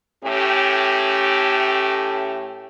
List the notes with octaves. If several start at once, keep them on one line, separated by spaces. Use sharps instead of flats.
A2 A3 C#4 G4